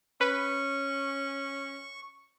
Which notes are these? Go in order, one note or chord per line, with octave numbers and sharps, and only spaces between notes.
C#4 B4 C#6